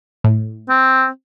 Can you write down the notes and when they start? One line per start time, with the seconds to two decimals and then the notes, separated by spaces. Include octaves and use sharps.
0.24 A2
0.69 C4